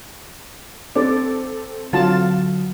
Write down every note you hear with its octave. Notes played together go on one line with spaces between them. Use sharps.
C4 A4 D5
D3 F#3 F4 F#4 A5